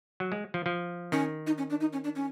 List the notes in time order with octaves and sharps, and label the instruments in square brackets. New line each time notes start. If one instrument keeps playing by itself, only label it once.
[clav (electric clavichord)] F#3
G#3
F3
F3
[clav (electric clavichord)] D#3 [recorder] C#4
[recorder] D#4
C#4
D4
D#4
C#4
D4
C#4